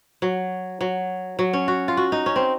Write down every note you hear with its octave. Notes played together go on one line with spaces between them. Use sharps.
F#3
F#3
F#3
C#4
F#4
F4
F#4
D#4
C#4
C4